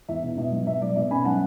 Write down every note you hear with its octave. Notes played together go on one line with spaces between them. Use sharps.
E2 E5
B2
B2 E5
F#3
B2 E5
F#3 D5
B2 E5
C#4 G#5 B5
F#3 F#5 A5